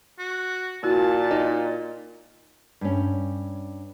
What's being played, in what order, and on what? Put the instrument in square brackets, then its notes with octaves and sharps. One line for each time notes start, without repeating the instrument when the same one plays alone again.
[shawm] F#4
[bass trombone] A#2 [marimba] E4 F#4 [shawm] A5
[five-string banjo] D#4
[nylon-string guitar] G2 C#4